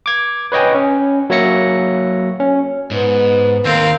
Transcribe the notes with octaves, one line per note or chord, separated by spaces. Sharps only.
D6 G#6
B4 C#5 D#5 G5 G#5
C#4
F#3 A#3 C#5 E5 A#6 C#7
C#4
G#2 B3
D#2 C4 A#4 F5